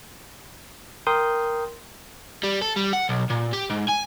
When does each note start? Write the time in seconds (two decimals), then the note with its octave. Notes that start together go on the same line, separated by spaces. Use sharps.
1.07 A#4 G5 C6 D#6 G6
2.43 G3
2.61 A4
2.76 G3
2.93 F#5
3.09 B1
3.30 A#2
3.53 G4
3.70 G#2
3.88 G#5